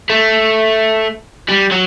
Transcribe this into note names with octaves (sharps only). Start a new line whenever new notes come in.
A3
G3
F#3